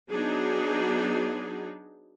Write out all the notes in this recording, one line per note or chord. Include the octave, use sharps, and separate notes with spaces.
F#3 B3 D4 D#4 G#4